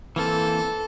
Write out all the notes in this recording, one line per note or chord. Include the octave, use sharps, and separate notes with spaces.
E3 A#3 C4 A4